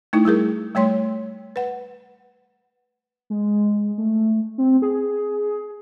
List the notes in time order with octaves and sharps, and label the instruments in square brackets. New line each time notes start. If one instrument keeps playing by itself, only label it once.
[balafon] A3 D#4 E4
G3 E4 G#4 A#4
G3 A3 C#5 C6
B4 F#5
[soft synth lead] G#3
A3
C4
G#4